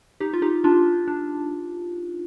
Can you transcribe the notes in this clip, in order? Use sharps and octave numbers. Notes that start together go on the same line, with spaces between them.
D#4 G4
F4
D#4 G4
D4 F4
D4